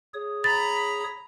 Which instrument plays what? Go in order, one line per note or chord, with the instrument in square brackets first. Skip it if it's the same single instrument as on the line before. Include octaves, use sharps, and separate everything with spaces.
[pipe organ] G#4 C#5 D#6
[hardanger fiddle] A#5 B5 [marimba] A6